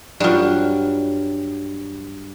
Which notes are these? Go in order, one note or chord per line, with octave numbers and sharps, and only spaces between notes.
G2 F#3 F4 D5